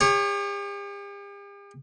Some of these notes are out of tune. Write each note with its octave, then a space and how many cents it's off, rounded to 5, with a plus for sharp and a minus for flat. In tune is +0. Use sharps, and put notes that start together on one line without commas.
G4 +45 C#5 -5